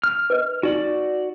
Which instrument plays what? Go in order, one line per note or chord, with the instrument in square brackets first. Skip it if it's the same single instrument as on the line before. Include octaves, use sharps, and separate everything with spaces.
[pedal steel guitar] F6
[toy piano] B4 D#5
[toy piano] D#4 [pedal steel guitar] F#4 D5